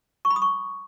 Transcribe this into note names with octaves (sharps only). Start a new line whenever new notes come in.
C#6
B5
D#6
C#6